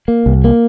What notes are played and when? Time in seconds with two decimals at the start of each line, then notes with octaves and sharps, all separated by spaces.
0.08 A#3
0.26 C2
0.44 A#3